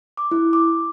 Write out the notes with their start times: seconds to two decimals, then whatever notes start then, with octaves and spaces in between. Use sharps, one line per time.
0.17 D6
0.31 E4
0.53 D6